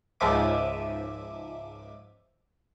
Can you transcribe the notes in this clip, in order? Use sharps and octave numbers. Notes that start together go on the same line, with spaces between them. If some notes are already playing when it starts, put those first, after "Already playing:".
C#2 G#2 F3 E5 D6 D#7